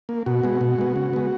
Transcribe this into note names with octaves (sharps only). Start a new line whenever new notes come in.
A#3
B2 F#4
G#3 B3
B2
G#3 B3
C#3
G#3 B3